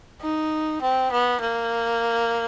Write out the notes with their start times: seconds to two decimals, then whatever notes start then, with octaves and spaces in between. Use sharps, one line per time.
0.21 D#4
0.82 C4
1.12 B3
1.40 A#3